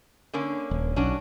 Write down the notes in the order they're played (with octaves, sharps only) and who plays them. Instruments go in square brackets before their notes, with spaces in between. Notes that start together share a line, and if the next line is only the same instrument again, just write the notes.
[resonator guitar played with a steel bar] D3 A#3 C#4
[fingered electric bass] D#1
[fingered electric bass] B1 [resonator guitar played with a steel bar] C#4 D4 F#4